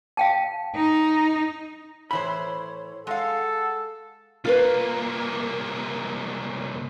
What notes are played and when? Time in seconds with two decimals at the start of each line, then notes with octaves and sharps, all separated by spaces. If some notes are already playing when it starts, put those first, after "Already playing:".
0.17 F5 G5 A5
0.75 D#4
2.11 A2 E3 C5 C#5 B5
3.07 G#3 A4 F5 F#5
4.45 C2 A#3 F4 A#4 B4